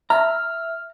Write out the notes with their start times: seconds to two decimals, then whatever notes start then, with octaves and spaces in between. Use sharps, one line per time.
0.10 E5 A#5 F6